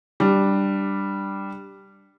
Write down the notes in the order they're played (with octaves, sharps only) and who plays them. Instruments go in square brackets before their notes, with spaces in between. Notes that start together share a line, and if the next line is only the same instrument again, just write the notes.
[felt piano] G3 D4